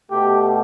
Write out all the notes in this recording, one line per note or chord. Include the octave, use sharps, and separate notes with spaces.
B2 A3 G4